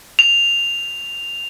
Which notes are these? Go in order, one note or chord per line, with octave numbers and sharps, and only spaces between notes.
F7